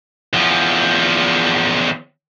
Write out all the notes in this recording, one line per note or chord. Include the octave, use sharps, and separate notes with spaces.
E2 F3